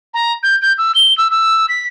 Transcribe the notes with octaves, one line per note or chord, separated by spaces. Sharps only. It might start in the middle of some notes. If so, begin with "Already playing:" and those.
A#5
G6
G6
E6
G7
E6
E6
B6